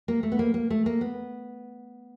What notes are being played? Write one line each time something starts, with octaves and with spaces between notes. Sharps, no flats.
A#3
A3
B3
A#3
A#3
A3
A#3
B3